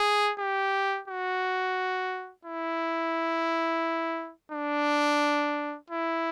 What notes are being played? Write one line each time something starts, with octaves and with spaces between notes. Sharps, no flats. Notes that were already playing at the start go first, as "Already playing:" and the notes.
Already playing: G#4
G4
F#4
E4
D4
E4